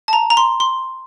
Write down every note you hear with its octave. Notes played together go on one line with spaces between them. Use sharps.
A5
A#5
A#5
C6
C6